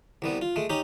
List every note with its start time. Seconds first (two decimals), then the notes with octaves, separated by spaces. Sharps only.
0.22 C2 G3 B3
0.42 F4
0.56 G#3 A3
0.70 C#4 D#4 G4